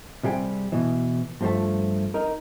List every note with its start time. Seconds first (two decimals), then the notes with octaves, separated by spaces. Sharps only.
0.23 C3 G3 G#4 G5
0.72 B2 E3
1.41 G2 F3 A3
2.14 D#4 A#4